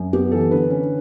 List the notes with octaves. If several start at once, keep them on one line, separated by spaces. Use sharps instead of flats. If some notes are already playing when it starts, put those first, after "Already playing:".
Already playing: F#2
B3 G4
E3 A4
D3 B4
C#4